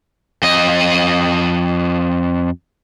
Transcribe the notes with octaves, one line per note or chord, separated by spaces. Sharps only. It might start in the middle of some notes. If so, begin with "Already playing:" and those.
F2 D#5